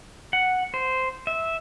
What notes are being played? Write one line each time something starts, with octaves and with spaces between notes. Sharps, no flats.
F#5
C5
E5